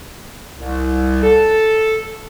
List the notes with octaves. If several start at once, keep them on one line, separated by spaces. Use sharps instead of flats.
C2
A4